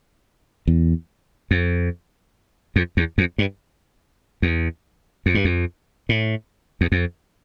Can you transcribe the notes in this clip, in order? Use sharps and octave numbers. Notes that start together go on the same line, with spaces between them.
E2
F2
F2
E2
F2
G2
E2
F2
G2
F2
A2
E2
F2